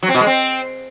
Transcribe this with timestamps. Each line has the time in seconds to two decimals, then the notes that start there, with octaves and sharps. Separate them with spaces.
0.03 F#3
0.09 C4
0.15 B2
0.21 G#3
0.26 C4